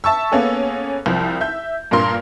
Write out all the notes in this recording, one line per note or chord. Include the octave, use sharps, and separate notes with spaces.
E5 A5 C#6 E6
A#3 B3 C#4 G#4 A4
C2 F3
E5 G6
G2 A#2 F4 A#4 C6